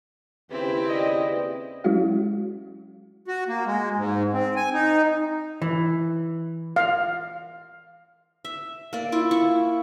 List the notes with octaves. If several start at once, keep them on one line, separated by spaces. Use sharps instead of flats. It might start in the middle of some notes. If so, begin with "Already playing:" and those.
D#2 C#3 C4 E4 G4 B4
D5 D#5
F#3 G#3 C#4 E4 F#4 F5
F#4
A#3
G#3
G#2
C4
G#5
D#4
E3
F5
E5
A#3 D5
E4 F4
E4 C#6